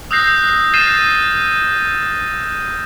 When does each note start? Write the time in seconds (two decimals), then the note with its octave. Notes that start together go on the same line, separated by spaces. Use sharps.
0.11 D#6 E6 F#6 G6 A#6 C7
0.74 F6 G6 A6 C7 D#7 E7